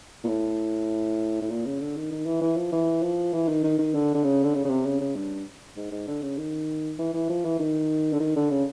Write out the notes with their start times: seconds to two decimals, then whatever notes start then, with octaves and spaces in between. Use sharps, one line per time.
0.24 A#2
0.28 A2
1.42 A2
1.50 A#2
1.66 C#3
1.80 D3
1.96 D#3
2.12 D#3
2.26 E3
2.42 E3
2.57 F3
2.72 E3
3.02 F3
3.33 E3
3.48 D#3
3.64 D#3
3.79 D#3
3.94 D3
4.14 D3
4.24 C#3
4.44 D3
4.54 C#3
4.65 C#3
4.70 C3
4.86 C#3
5.00 C#3
5.16 G2
5.76 G#2
5.91 G#2
6.08 D3
6.22 C#3
6.38 D#3
6.98 E3
7.14 E3
7.29 F3
7.45 E3
7.59 D#3
8.13 D3
8.20 D#3
8.36 D3
8.50 C#3